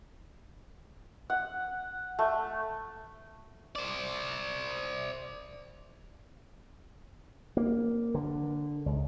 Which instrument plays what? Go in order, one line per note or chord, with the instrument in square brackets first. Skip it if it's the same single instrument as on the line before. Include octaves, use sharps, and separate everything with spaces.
[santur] F#5
A3
[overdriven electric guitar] C5 D5
[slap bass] A#3
D3
C#2